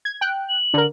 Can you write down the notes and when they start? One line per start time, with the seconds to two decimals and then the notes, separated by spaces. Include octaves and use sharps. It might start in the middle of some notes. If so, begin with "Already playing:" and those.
0.05 G#6
0.21 G5 F#6
0.49 F#7
0.74 D3 A#4